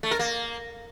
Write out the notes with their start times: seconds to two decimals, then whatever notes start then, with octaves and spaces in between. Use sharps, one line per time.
0.03 A3
0.11 A#4
0.19 A#3